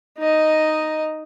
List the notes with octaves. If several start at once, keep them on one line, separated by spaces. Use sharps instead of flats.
D#4 D#5